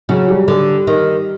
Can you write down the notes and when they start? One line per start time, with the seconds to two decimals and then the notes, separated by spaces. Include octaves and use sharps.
0.09 C#3 F#3
0.28 G3
0.48 D3
0.87 D#3